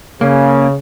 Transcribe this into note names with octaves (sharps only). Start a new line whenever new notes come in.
C#3 A#3 C#4